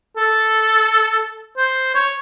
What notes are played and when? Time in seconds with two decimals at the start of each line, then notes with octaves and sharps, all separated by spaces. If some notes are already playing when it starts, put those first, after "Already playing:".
0.17 A4
1.57 C5
1.95 C#5